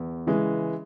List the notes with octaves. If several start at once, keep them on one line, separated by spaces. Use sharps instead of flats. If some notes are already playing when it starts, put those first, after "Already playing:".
Already playing: E2
C#3 E3 G#3